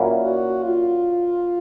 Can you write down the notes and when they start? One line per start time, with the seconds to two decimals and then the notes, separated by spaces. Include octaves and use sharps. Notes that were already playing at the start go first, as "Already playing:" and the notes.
Already playing: A#2 F#3 A#3 C#4 E4
0.23 F#4
0.64 F4